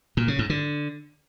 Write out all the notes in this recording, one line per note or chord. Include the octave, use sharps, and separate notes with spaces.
A#2
C#3
G#2
D3